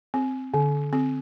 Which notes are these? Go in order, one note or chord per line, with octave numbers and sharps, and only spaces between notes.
C4
D3
C4